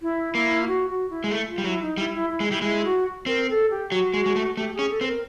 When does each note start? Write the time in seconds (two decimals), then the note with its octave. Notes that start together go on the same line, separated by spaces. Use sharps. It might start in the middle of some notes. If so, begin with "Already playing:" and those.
0.01 E4
0.34 A#3 E4
0.61 F4
0.66 F#4
0.89 F#4
1.09 E4
1.24 G#3
1.31 A3
1.47 F4
1.58 G3
1.64 F#3 E4
1.81 D#4
1.97 G3 E4
2.14 E4
2.29 E4
2.40 G#3
2.46 E4
2.51 G3
2.62 G#3 E4
2.84 F#4
3.26 C4 A#4
3.49 A4
3.70 G4
3.91 F#3 F#4
4.14 G#3
4.26 G#3
4.36 A3
4.57 A3 G4
4.74 G#4
4.79 C#4
4.89 A4
5.01 C4 B4
5.06 A#4